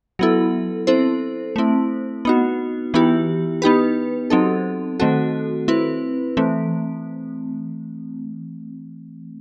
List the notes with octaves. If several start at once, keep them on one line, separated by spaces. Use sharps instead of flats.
F#3 B3 E4 A4
C4 E4 A4 C5
A3 C4 E4
B3 D#4 F#4
E3 B3 E4 G4
B3 D#4 G4 B4
F#3 C4 D#4 A4
D#3 A3 C4 F#4 A4
C4 E4 B4
E3 A3 C4